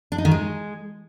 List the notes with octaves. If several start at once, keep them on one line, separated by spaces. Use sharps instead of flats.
D4
D#4
D#3
G#3